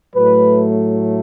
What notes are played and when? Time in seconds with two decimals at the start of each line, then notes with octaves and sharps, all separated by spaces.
0.14 A2 F#3 A3 B4